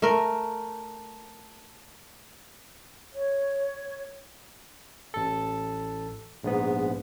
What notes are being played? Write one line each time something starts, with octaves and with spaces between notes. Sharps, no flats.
A3 A#4
C#5
A1 A4
A#1 G#2 B3